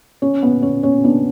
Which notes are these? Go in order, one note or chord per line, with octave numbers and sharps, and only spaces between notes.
C#4
B3
C#4
C#4
B3 D4